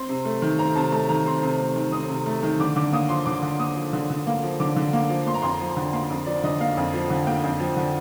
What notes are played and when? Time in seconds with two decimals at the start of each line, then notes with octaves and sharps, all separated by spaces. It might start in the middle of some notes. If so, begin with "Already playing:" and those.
Already playing: C4 C6
0.09 C3
0.25 A3
0.42 D#3
0.58 C4 A#5
0.75 C3 A5
0.92 A3 A#5
1.09 D#3 A#5
1.26 C4 C6
1.43 C3
1.59 A3
1.76 D#3
1.92 C4 D#6
2.09 C3
2.26 A3
2.43 D#3
2.60 D3 D6
2.76 D3 D6
2.93 A#3 D#6
3.09 F3 C6
3.26 D3 D6
3.42 D3
3.59 A#3 D#6
3.76 F3
3.93 D3
4.10 D3
4.27 A#3
4.43 F3
4.60 D3 D6
4.76 D3
4.93 A#3
5.10 F3
5.26 A#3 C6
5.34 A#5
5.42 F2 C6
5.60 F3
5.76 D3
5.93 A#3 C6
6.10 F2
6.26 F3 D5
6.43 D3 D#5
6.61 A#3 F5
6.77 F2
6.94 F3
7.10 D3
7.27 A#3 G5
7.44 F2
7.60 F3
7.76 D3